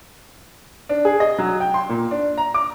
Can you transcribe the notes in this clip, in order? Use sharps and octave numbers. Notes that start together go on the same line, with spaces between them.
D4
G#4
D#5
F#3
G5
C6
A#2
D4
A#5
D6